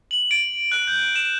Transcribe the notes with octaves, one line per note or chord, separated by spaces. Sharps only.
F#7
D7
F#6
G6
E7